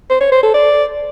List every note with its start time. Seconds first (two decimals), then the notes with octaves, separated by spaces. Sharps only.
0.10 C5
0.21 C#5
0.32 C5
0.43 A4
0.54 D5